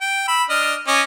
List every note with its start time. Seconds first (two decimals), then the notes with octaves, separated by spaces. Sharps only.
0.01 G5
0.28 B5 E6
0.50 D4 D#5 F6
0.87 C#4 D#5 D6